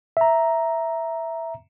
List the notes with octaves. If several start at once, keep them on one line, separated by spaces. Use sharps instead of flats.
E5 A#5